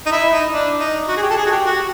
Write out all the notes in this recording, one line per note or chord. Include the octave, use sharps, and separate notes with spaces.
D#4
E4
D#4
D4
D#4
F#4
G#4
G4
A4
G#4
F#4
G4
F#4